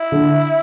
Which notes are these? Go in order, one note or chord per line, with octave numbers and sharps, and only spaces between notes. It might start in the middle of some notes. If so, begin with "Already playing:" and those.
Already playing: E4
D3